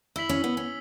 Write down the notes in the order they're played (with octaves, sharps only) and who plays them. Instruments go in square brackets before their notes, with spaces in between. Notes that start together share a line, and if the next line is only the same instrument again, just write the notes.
[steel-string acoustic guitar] E4 [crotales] E6 B6 F#7
[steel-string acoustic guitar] C#4
B3
C#4